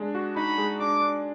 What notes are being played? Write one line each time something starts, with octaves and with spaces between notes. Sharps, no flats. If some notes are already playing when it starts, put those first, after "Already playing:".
Already playing: G#3 D4
F#4
D#4 B5
G#3
D4 D6
D4